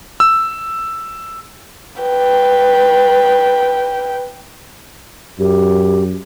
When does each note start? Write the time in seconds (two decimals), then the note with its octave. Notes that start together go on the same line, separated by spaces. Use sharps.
0.20 E6
2.01 B4 G5
5.39 F#2 G4